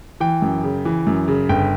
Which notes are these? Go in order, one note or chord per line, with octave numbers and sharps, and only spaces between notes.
E3 G5
F#2
C#3
E3
F#2
C#3
G1 G5